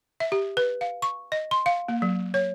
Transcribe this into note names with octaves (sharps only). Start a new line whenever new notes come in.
E5
G4
B4
F5
C#6
D#5
C6
F5
A#3
F#3
C#5